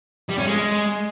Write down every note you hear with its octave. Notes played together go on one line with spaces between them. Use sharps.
G3
C#4
G#3